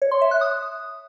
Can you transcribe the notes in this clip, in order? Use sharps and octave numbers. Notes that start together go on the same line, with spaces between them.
C#5
C6
E5
F#6
D#6